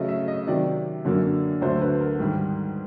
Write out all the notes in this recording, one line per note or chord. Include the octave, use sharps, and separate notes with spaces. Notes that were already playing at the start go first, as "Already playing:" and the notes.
Already playing: C#3 F#3 A3 D#5
E5
D#5
C3 D#3 F#3 D5
F#2 D3 F#3 A#3
D2 D3 F#3 A3 C5
B4
A#4
G#2 D#3 G3